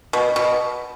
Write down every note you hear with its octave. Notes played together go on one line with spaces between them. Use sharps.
B2
B2